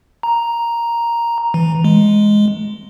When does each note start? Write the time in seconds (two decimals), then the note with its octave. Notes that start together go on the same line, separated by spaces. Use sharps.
0.23 A#5
1.54 E3
1.84 G#3